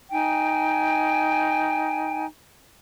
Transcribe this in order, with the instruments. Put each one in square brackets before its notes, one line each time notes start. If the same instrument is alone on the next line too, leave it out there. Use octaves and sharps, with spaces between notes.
[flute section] D#4 G5 G#5